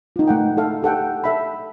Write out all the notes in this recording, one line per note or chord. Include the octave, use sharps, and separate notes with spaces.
D#4 F4
A3 F#5 G5
E4 A4 F5
G4 A4 F#5 G5
A4 E5 B5